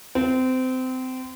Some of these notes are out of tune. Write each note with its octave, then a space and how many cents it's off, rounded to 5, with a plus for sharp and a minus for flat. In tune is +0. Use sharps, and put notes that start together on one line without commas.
C4 -25